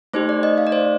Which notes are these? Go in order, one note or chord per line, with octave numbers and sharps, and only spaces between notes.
A3 D#4 G4 C5
D5
D#5
F5
D5
C5